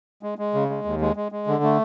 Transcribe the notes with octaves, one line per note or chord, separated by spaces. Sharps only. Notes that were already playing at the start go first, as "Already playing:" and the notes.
G#3
G#3
C#3
G#3
D#2
G#3
G#3
G#3
D3
A3